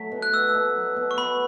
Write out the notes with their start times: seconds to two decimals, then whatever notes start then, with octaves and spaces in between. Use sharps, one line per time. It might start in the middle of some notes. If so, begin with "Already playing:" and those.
Already playing: F#3 A3 B6
0.12 B2
0.22 F#6
0.33 A3 E6
0.55 B2
0.76 F#3
0.97 B2
1.11 C#6
1.18 B3 B5